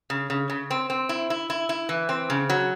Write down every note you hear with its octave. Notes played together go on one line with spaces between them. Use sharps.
C#3
C#3
C#3
C4
C4
E4
E4
E4
E4
E3
C4
C#3
F#3